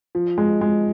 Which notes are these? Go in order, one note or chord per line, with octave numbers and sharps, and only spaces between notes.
F3
G#3
G#3